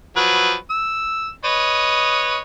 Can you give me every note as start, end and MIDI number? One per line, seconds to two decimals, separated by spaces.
0.16 0.54 53
0.16 0.54 54
0.16 0.54 71
0.70 1.29 88
1.45 2.39 71
1.45 2.39 73
1.45 2.39 75